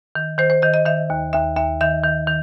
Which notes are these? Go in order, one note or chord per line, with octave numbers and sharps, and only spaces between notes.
D#3
D#3 C5
C5
D#3 D#5
D#5
D#3 E5
D#2
D#2 E5
D#2 E5
D#3 E5
D#3
D#3